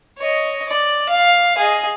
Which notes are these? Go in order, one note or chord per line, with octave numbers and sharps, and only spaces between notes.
C#5 D#5
D5
F5
G#4 D#5